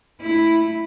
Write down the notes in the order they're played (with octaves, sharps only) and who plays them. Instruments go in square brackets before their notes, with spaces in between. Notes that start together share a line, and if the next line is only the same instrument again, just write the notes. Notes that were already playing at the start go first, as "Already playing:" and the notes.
[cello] A3 E4